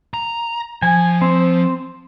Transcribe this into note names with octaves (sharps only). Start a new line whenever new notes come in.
A#5
F3 G#5
C4